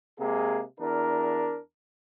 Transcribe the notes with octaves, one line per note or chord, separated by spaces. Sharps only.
C3 G#3 A#3 G#4
E2 D4 A#4